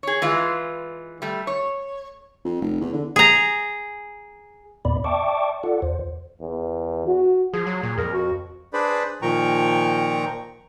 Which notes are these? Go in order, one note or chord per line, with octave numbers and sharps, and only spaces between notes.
G#4 C#5
E3 G#3 F4
G3 A3
C#5
F2
F1
E2
D3
G#4 A#5
E2 A#2 B3 D5 B5
D5 E5 G5 A5 C#6 D6
F4 A4 D5 F#5
E2 C5
E2
F#4
F3 G#4
F#3
A#2
F2 A#4
F#4
D4 G#4 B4 C5 D5 B5
A#2 D#3 F3 G5 A#5 C#6